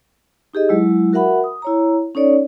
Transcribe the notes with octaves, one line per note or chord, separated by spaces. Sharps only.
D#4 G4 G#4 D#5
F#3 G#3 E4
F#4 A#4 E5 F#5 B5
D#6
E4 C#5 A#5
C#4 D#4 A4 C#5 D5